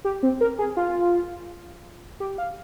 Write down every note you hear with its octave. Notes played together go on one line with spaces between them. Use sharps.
G4
C4
A#4
G#4
F4
G4
F5